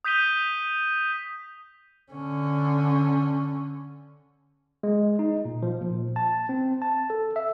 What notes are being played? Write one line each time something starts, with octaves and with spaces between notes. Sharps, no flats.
D#6 G6 B6 D#7 G7
D3 C#4
G#3
D#4
A#2
F3
A#2
A5
C4
A5
A4
E5